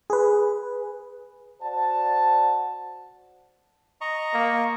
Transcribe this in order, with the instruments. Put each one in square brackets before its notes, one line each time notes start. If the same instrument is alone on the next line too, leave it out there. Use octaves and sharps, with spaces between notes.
[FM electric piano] G#4 B4
[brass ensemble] F#4 C5 D5 F#5 A5
[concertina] D#5 A#5 C#6
[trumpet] A#3